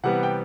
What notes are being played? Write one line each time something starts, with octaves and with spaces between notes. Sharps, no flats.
C3 E3 G3 B3 F#5
G5